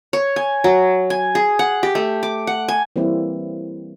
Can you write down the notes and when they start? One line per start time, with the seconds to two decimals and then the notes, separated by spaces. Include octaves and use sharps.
0.13 C#5
0.36 G#5
0.64 F#3
1.10 G#5
1.35 G#4
1.59 F#5
1.83 G4
1.95 A3
2.23 D6
2.47 F#5
2.68 G#5
2.96 E3 G3 A#3 C4 E4